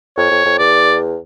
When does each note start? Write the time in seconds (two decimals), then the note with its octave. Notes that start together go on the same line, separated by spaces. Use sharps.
0.17 F2 C#5
0.31 F2
0.45 F2
0.59 E2 D5